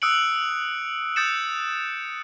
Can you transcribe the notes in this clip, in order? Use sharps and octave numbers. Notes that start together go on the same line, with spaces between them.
D#6 E6 F#6 C#7 D7 F#7
D#6 G6 A6 C#7 E7